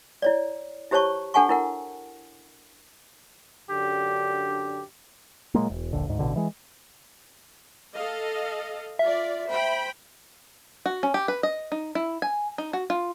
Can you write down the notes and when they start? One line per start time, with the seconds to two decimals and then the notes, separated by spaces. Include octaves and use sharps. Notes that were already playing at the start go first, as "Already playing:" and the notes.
0.22 E4 C#5 D5
0.91 E4 G4 C5 C#5 A5 C#6
1.34 D4 A4 F#5 G#5 A5 C#6
1.49 E4 A#4 F#5
3.70 F#2 D3 D4 G4
5.54 A#2 F#3 G#3 A#3
5.70 E1
5.93 D#1 A#1 D3
6.07 D2 G#2
6.19 A1 B2 D3
6.36 E3 G#3
7.93 A4 D#5 F5
8.99 F4 D5 E5
9.50 C5 G5 B5
10.86 F#4
11.03 C#4
11.14 G4
11.28 B4
11.43 D#5
11.72 D#4
11.95 E4
12.22 G#5
12.58 D#4
12.73 F#4
12.90 F4